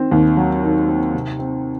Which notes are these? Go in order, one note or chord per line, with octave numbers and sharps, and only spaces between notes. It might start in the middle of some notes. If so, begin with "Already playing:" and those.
Already playing: D#3 C4
D#2
F#3
D#3
C4
C3
C4